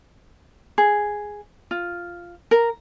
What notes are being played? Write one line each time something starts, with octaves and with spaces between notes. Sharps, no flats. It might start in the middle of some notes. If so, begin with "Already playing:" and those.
G#4
F4
A#4